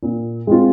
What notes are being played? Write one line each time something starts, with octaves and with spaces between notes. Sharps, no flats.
A#2
G#3 C4 F4